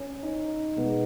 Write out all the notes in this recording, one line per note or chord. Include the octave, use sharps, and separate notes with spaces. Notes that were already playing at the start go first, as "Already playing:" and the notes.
Already playing: C#4
D#4
B2 G#3 B3